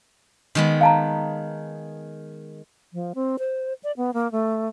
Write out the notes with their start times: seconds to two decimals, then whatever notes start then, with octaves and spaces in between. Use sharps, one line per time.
0.55 D#3 G#3 B3
0.81 F5 A5 A#5
2.93 F3
3.15 C4
3.39 C5
3.83 D5
3.97 B3
4.14 A#3
4.32 A3